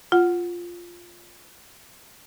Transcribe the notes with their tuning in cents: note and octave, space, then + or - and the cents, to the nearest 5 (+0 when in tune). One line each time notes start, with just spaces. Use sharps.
F4 +0 F#5 +0